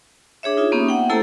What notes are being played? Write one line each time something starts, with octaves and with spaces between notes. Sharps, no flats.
D4 G#4 C#5 E5
D#4 F4 E5
A#3 B3 C#4 G4
F#5 G5
A3 E4 A4 C5 A5 A#5